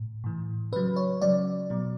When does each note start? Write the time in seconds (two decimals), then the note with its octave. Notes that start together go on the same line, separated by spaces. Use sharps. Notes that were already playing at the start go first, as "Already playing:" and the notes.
Already playing: A2
0.24 A2 E3
0.72 C#3 F#3 B4
0.96 C#5
1.22 C#3 F#3 D5
1.70 B2 F#3